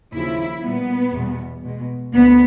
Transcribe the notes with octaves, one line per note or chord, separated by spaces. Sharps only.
D#2 C#3 F3 E4
A#2 G3 A#3 B3
E2 B2 G3
B2 G#3
D2 D3 B3